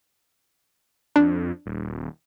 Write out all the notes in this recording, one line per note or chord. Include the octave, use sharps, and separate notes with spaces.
F2 D4
D#1